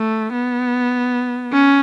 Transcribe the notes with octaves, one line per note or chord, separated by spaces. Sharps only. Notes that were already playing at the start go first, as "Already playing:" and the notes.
Already playing: A3
B3
C#4